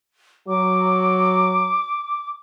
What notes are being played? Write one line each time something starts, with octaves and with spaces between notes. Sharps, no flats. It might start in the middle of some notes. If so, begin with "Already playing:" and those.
F#3 D6